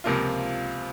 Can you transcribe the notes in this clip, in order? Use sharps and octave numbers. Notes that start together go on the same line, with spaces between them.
C#2 C3 F3 A#3 F4